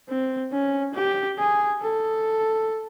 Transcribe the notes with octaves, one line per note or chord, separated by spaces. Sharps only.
C4
C#4
G4
G#4
A4